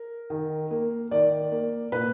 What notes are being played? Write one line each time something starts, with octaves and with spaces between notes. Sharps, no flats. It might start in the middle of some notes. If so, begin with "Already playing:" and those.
Already playing: A#4
D#3
A#3
D#3 D5
A#3
A#2 B4